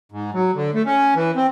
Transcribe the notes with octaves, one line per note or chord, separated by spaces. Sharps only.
G#2
F#3
D3
A3
C#4
E3
C4